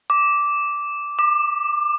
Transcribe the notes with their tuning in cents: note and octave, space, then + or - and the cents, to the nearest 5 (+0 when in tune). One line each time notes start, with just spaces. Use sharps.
D6 -10
D6 +25